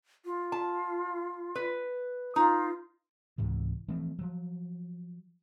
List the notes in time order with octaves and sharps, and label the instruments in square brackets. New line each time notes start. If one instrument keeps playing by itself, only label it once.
[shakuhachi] F4
[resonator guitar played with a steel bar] A5
B4
[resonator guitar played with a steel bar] D#4 [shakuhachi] F4
[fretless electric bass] C#2 G#2 C3 E3
E3 F3 A3 C4
F3 F#3